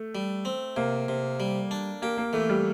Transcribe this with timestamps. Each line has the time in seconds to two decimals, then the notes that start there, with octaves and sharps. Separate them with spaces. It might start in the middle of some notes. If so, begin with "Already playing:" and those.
Already playing: A3
0.15 G3
0.45 C4
0.76 C3 A#3
1.08 C3
1.40 G3
1.71 D4
2.02 A#3 G4
2.18 A#3
2.33 E3 A3
2.49 G3